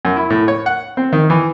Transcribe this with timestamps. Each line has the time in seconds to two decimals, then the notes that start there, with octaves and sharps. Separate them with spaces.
0.05 F#2
0.16 E4
0.30 A2
0.48 C#5
0.66 F#5
0.97 C4
1.13 D#3
1.30 E3